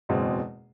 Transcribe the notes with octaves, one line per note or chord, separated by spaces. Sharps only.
F#1 E2 B2 G#3 C4